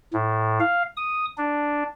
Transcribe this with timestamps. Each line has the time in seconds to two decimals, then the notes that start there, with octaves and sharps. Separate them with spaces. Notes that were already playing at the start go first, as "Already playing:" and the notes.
0.13 A2
0.60 F5
0.97 D#6
1.38 D4